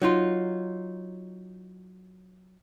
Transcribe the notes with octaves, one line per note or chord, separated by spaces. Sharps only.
F#3 D#4 F4